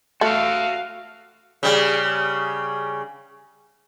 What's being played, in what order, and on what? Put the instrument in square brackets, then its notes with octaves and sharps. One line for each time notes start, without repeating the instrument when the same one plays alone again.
[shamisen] A3 [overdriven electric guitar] F#4 E5 [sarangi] F5
[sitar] C#3 G3